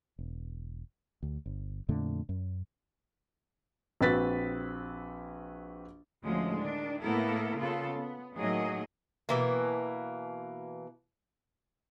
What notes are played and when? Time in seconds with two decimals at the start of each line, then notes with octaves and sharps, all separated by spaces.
0.19 E1
1.23 D2
1.46 G1
1.89 F2 A#2 D3 A3
2.29 F#2
4.01 A#1 C4 F#4 B4 A6 B6
6.24 D2 A2 F3 G#3 C#4
6.58 D#3 D4
7.02 A2 A#3 B3 E4 A4 A#4
7.57 C#3 B3 F4 A4
7.96 B3
8.36 A2 D#3 F#3 A#3 G#4 D#5
9.29 B2 E3 A#3